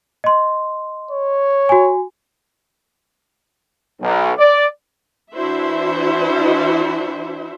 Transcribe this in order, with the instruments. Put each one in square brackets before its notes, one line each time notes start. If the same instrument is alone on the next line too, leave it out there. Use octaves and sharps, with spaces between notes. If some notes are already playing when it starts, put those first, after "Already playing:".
[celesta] D#5 C6
[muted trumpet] C#5
[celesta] F#4 G#5
[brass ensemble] B1
D5
[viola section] E3 D4 E4 F#4 C5 E5